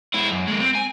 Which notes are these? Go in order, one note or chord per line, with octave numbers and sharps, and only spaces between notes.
G#3 E4
F#2
G#3 A#3
C4
G#5